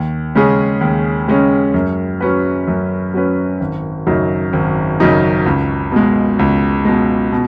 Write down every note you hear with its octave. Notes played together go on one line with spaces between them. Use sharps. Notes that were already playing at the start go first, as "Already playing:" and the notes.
Already playing: D#2
C#3 G#3 C#4 G#4
D#2
C#3 G#3 C#4 G#4
F#2
F#3 C#4 B4
F#2
F#3 C#4 B4
G#1
F#2 C#3 F#3 D#4
G#1
F#2 C#3 F#3 D#4
C#2
B2 G#3
C#2
B2 G#3
B2